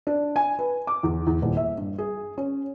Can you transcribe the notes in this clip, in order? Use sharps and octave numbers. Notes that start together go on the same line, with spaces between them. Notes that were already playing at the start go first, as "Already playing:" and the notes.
D4
G#5
B4
D6
E2
E2
D#1
E5
G2
G#4
C#4